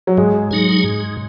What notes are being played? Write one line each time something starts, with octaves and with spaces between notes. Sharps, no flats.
F#3
G#2 G#3
F#3 D#4 G#4
G#2